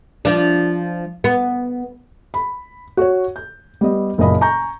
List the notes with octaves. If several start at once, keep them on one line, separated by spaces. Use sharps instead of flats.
F3 D4
B3
B5
F#4 C#5
G6
G3 B3 D#5
F#1 A#2 D#5 B5
G#5 A#5 C#6 G6